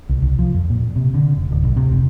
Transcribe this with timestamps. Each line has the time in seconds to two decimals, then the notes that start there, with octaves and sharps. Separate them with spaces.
0.09 C2
0.22 C2
0.39 F3
0.55 F2
0.70 A#2
0.96 C3
1.14 D3
1.37 F1
1.51 D1
1.64 B1
1.77 C3
1.92 F1